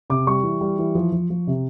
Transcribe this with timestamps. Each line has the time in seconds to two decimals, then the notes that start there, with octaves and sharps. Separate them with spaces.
0.10 C3 D6
0.27 G3 C#6
0.43 E3
0.61 G3
0.79 E3
0.95 F3
1.12 F3
1.30 F3
1.47 C3